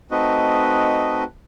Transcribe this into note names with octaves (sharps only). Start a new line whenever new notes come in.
A3 C4 D#4 F#4 B4 D#5